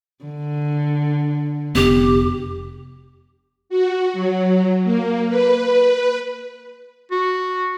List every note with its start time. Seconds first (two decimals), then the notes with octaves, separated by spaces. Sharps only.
0.25 D3
1.75 F1 B3 G4
3.69 F#4
4.13 F#3
4.84 A#3
5.29 B4
7.11 F#4